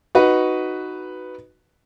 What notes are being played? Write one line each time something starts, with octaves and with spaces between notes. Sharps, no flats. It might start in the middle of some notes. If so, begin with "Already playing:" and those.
D#4 F#4 B4